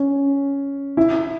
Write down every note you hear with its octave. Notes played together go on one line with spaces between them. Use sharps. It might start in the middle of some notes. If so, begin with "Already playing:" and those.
Already playing: C#4
E4